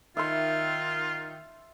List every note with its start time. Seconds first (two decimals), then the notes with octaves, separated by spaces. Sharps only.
0.17 D#3 F4 E5 C6